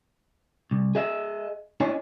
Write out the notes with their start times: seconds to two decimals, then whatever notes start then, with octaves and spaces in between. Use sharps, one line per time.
0.71 C2
0.95 G#4 D#5 E5
1.80 D4 E4 C#5 D#5 G#5